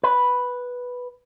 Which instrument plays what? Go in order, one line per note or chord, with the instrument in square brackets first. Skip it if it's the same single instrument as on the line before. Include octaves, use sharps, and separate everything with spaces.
[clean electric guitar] B4